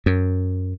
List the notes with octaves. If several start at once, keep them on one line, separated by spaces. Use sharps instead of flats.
F#2